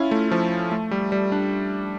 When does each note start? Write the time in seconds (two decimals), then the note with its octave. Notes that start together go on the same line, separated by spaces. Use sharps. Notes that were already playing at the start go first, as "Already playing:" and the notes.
Already playing: C#4 E4 F4
0.11 A3
0.31 F3
0.72 A3
0.91 G3
1.12 G3
1.32 D4